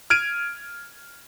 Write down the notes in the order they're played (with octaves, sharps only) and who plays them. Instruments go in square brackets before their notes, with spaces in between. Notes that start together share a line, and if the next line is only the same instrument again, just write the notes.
[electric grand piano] F6 G#6 D7 D#7